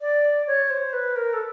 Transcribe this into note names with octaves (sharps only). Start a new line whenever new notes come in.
D5
C#5
C5
B4
A#4
A4